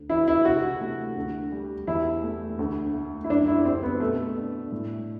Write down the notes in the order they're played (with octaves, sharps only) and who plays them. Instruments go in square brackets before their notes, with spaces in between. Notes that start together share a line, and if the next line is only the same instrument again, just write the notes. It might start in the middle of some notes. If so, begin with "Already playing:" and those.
Already playing: [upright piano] D2
[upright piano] E3 [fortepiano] E4
[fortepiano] E4
[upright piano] C3 [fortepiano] F#4
[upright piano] A3
D2
G3
[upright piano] E2 [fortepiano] E4
[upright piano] A3
D2
A3
[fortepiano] E4
[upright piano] F#2 [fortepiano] D4
[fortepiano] E4
[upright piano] G3 [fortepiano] C4
[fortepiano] B3
[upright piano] B2 [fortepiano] A3
[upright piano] D4
A2